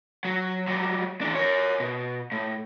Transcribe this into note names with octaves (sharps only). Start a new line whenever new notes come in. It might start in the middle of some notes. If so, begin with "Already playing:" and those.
F#3
F#3 G3
E3 D4
A#4 C#5
B2
A2